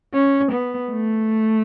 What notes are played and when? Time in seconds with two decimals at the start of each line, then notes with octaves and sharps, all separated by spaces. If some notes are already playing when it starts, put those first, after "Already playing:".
0.14 C#4
0.52 B3
0.91 A3